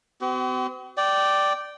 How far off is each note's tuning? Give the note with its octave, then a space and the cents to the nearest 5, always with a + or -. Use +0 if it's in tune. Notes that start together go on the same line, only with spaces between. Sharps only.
C4 -45 F#4 +45
D5 +0 G5 -20